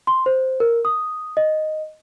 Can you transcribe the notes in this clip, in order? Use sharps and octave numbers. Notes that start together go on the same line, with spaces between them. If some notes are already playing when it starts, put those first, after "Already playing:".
C6
C5
A#4
D#6
D#5